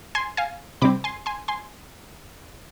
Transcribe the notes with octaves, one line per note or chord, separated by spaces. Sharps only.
G#5 C6
F5 G#5
C3 G3 C4 B5 D6
G#5 C6
G#5 C6
G#5 C6